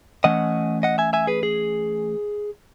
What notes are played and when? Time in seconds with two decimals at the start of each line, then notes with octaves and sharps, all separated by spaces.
0.24 E3 A3 C#4 D#5 F#5
0.83 D#5 F#5
0.98 E5 G#5
1.13 E5 G#5
1.27 G#4 B4
1.43 G#4